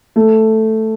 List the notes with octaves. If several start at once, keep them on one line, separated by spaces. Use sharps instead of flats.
A3